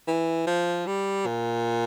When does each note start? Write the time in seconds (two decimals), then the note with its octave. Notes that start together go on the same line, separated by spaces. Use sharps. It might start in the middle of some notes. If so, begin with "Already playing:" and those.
0.07 E3
0.47 F3
0.86 G3
1.26 A#2